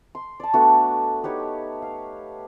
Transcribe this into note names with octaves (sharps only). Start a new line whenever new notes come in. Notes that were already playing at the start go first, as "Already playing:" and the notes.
C6
D5 A5
A3 B3 D4 F#4
D#4 G4 B4 C#5
F5